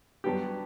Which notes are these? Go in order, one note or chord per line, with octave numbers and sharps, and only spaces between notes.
G2 F#3 B3 D4 G4